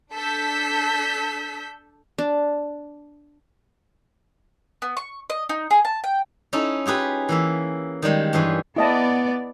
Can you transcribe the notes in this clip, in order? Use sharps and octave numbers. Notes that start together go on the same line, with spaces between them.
D4 A4 E6 G6 B6
D4
B3
C#6
D#5
D#4
G#4
A5
G5
C#4 D#4 E4 A4
F4 G4 G#4 B4
E3 A#3 E5
D#3 G3 G#3 A#3
G2 E3 G#4 C5 C#5
B3 E4 D5 D#5 A5